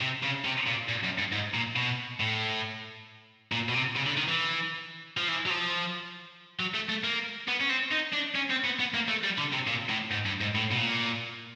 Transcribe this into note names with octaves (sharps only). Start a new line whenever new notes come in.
C3
C#3
C3
A#2
A#2
F#2
G2
G#2
A#2
B2
A2
A#2
B2
C3
C#3
D3
D#3
E3
F3
E3
F#3
F3
F#3
A3
A3
A#3
B3
C#4
C4
D#4
D4
C#4
C4
B3
B3
A#3
A3
G3
D3
C3
A#2
A2
G#2
G2
G#2
A2
B2
A#2